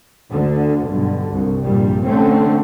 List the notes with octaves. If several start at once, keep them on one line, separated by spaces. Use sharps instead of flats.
D2 D3
B1 G2 D3
C2 G2
A#1 G2 A#2 G3
D3 A3 C4 C#4